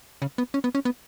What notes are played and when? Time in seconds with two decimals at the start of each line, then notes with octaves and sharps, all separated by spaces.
0.22 C#3
0.38 B3
0.54 C#4
0.64 B3
0.75 C#4
0.85 B3